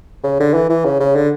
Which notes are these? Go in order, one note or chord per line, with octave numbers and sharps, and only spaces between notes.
C#3
D3
E3
E3
C#3
C#3
D3